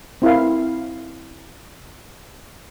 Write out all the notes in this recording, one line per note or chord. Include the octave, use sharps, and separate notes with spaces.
C4 E4 A#4 F5